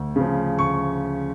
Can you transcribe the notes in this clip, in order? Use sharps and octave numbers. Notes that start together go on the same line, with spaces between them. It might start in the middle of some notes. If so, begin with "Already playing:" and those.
Already playing: D2
C#3 F3
D2 C#6